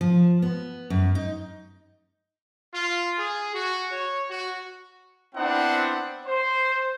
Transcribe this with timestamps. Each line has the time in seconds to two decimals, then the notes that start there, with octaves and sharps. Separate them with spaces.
0.01 F3
0.42 B3
0.90 F#2
1.15 D#4
2.74 F4
3.17 G#4
3.53 F#4
3.91 C#5
4.29 F#4
5.35 B3 C4 D4 E4 F#5
6.26 C5